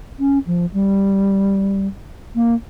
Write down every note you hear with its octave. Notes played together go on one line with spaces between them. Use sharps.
C#4
F3
G3
A#3